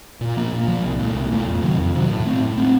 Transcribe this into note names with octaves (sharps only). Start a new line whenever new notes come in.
A#2
F3 A#3
A#2
F3 A#3
C2
A#2 F#3 A3
C2
A#2 F#3 A3
F2
C3 D#3 F#3
F2
C3 D#3 F#3
A2
A3 C4
A2
A3 C4